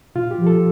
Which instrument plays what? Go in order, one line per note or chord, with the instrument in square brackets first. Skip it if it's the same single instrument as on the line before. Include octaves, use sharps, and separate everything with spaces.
[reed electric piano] A#2 F4
G4
F3
A4